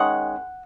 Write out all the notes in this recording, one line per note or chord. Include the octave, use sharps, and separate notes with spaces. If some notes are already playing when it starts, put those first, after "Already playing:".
Already playing: D#3 G#3 C#4 F#5